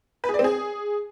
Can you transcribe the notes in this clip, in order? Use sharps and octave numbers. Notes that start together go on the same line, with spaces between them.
B4
G#4
D5
C4
G#4